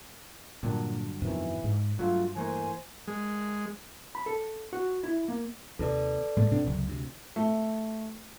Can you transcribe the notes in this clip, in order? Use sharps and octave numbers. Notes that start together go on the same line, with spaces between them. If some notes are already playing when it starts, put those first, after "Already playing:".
G2 A#2 D3 F#3
F2 B2 D#3 E3
G#2
G2 F#3 A3 F4
E3 A3 A#3 C5 G#5
G#3
B5
A4
F#4
E4
A#3
D#2 C3 A4 B4 D5
A2 G#3 A3
B2 C4 D4
C#2 F#2 C3
D2 C3
A3